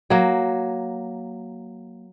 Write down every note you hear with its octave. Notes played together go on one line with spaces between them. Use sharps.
F#3 A#3